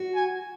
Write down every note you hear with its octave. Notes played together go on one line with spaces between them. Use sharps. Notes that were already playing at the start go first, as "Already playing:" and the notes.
Already playing: F#4
G#5